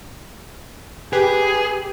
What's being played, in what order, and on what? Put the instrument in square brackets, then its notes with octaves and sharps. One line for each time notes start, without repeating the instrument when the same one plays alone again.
[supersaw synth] G4 [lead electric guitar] G#4 [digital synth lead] B4 [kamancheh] G#5